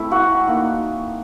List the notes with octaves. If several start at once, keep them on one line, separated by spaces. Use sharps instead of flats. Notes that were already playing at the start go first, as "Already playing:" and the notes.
Already playing: A3 C4 E4
F#4 F#5
A#3 D#4